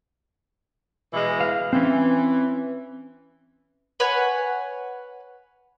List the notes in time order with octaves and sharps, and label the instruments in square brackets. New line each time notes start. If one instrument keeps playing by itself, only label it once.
[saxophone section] B2 E3 G#3
[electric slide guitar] F5
[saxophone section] E3 [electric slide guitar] C4 C#4
[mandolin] B4 C#5 F#5 G#5